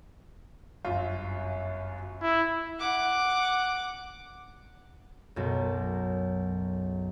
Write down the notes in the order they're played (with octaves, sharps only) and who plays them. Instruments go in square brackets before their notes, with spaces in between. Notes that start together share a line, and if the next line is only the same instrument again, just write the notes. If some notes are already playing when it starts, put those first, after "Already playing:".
[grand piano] G1 F#2 F4
[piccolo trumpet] E4
[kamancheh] F#5 D6
[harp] B1 F#2